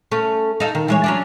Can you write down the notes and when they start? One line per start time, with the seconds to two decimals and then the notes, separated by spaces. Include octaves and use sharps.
0.11 A3 C#4
0.60 D#4 A4 F5
0.75 D#3
0.88 E3 G#3 C#5
1.04 F#3 C#4 D4